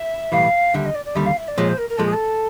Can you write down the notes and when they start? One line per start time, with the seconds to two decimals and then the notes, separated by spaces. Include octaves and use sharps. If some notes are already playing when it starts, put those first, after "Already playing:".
Already playing: E5
0.32 B1 A2 E3 G3 F5
0.74 D#2 D3 G3 E5
0.85 D#5
0.94 D5
1.04 D5
1.15 D#2 D3 G3 E5
1.26 F5
1.37 E5
1.47 D5
1.57 A#2 F3 G#3 C#5
1.68 C5
1.77 A#4
1.89 A#4
1.97 A#2 F3 G#3 A4
2.05 G#4
2.12 A4